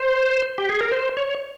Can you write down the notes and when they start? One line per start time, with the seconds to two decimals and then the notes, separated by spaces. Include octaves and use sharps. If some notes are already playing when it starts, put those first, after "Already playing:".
Already playing: C5
0.58 G4
0.70 G#4
0.81 A#4
0.91 C5
1.17 C#5